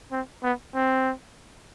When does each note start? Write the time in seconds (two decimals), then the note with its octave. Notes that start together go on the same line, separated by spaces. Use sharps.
0.11 C4
0.43 B3
0.75 C4